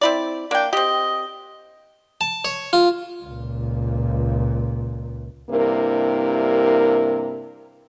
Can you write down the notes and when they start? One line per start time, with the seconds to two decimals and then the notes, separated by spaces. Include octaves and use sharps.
0.01 C4 E4 D5
0.51 A#3 D4 G5
0.73 C4 G4 D#5
2.21 A5
2.45 C#5
2.73 F4
3.24 C#2 A#2
5.50 G2 C3 A#3 D4 E4 A#4